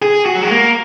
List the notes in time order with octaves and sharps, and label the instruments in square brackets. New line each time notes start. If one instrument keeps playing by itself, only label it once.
[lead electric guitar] G#4
F#4
F#3
G#3
A#3